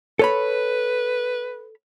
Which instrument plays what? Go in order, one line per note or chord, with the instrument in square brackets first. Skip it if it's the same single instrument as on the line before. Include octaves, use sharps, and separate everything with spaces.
[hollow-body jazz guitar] A4 C#5 B5 [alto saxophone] B4